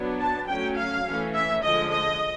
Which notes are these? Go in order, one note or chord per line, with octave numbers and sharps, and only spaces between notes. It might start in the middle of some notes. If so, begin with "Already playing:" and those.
Already playing: F#3 B3 D4
A5
F#3 A3 C#4 G5
F5
E3 A3 C#4
E5
D3 F3 G#3 D#5
D#5